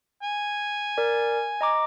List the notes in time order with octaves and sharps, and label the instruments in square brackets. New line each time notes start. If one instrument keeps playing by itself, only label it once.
[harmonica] G#5
[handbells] A#4 D5
D#5 A#5 D6